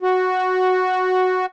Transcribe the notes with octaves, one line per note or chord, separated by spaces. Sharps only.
F#4